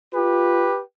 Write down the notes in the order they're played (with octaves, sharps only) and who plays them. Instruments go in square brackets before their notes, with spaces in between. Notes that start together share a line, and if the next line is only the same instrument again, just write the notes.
[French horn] F4 [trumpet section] G4 B4